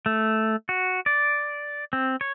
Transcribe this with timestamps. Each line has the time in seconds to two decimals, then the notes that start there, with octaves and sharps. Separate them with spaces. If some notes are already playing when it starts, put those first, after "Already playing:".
0.06 A3
0.69 F#4
1.06 D5
1.93 C4
2.21 C#5